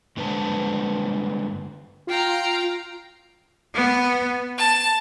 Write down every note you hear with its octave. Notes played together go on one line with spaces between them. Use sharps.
G2 D3 G#3 B4 C5 A5
F4 F5 G5 A#5
B3
A5